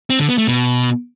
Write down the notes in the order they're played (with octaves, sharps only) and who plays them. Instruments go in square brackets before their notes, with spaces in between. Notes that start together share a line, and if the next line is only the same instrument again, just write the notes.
[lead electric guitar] C4
D3
B3
A3
B2